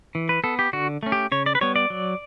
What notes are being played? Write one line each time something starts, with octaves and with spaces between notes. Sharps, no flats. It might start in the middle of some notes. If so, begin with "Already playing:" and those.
E3
B4
B3 A4
G4
D3 F#4
A3 C#4
G4
C#3 C#5
D5
B4
G3 B3 C#5
D5
F#3